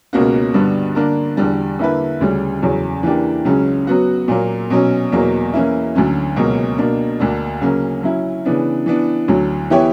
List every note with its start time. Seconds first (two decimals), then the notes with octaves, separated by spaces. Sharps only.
0.13 C#2 B2 A#3 C#4 F#4
0.54 G2 D3 G3 B3 D4
0.95 D3 A#3 D4 A#4
1.37 E2 D3 G3
1.79 D3 A#3 E4 B4
2.21 D2 C#3 G3
2.62 E2 C#3 F#3
3.03 E3 A#3 D4 G4
3.45 C#2 C#3 F#3 C#4
3.87 F#3 B3 F#4
4.28 A#2 F#3 A#3
4.70 B2 F#3 C#4
5.12 E2 B2 F#3 A#3
5.53 E3 A#3 C#4 E4
5.95 D2 D3 F#3 C#4
6.36 C#2 B2 F#3 A#3 C#4
6.78 B2 A#3 D4
7.19 D2 D3 A#3 D4
7.61 C#3 F#3 A#3 C#4
8.03 F#3 C#4 E4
8.45 C#3 E3 B3 D4
8.86 E3 B3 D4
9.28 D2 D3 F#3
9.70 E3 B3 E4 G4 C#5